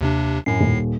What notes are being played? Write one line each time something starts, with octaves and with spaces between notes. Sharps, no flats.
D#2 C3 D4
F#2 A2 C7
D#1